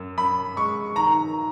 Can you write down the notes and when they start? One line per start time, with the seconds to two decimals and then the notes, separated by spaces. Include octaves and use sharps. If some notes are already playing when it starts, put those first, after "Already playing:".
Already playing: F#2
0.18 F#2 B5
0.56 G#3 C#6
0.96 D#3 A#5